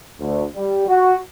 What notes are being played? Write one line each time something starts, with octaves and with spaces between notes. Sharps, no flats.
D2
G3
F#4